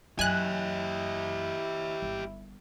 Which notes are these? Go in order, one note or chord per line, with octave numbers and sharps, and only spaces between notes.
F#2 E4 G4 D#5 G#5 F#6
G1